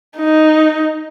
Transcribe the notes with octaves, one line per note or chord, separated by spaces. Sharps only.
D#4